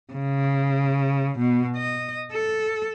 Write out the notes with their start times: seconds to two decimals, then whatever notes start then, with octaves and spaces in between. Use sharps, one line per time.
0.13 C#3
1.39 B2
1.76 D#5
2.32 A4